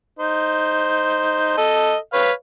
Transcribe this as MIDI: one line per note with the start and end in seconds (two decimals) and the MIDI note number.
0.19 1.53 63
0.19 1.53 72
1.57 1.96 69
1.57 1.96 75
2.13 2.31 71
2.13 2.31 73
2.13 2.31 77